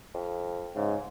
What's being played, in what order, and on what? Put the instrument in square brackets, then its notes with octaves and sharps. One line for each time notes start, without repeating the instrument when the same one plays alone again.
[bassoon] F2
[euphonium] G#2 [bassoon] C#3